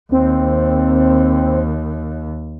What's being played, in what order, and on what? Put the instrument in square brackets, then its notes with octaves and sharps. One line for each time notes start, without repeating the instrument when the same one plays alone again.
[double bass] D#2 [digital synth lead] C4